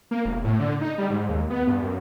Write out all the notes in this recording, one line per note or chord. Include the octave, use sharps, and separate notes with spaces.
A#3
E1
A2
D3
D#4
G3
G#2
D#2
B3
G2
F#2